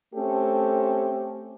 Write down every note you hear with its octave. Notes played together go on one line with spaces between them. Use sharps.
A3 C4 C#4 G4 A4